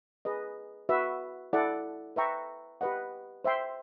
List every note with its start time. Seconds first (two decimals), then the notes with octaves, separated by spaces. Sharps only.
0.25 G#4 B4 D#5
0.89 F#4 B4 E5
1.53 E4 A4 D5 F#5
2.16 B4 E5 G5 A#5 C#6
2.81 G4 B4 D#5 F#5
3.44 C5 E5 G5 C6